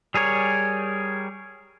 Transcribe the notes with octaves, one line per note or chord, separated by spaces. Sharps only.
G3 G#4 A#4 C#5